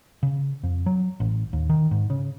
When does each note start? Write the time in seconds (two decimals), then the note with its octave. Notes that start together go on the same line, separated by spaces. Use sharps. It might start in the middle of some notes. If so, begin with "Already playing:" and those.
0.23 C#3
0.63 F2
0.86 F#3
1.20 A1
1.53 D#2
1.70 D#3
1.91 G#2
2.10 C#3